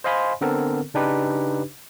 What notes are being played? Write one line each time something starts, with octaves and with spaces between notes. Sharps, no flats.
C5 D#5 F5 G#5 B5 C6
D3 B3 C4 A4 A#4
C#3 D4 D#4 G4 B4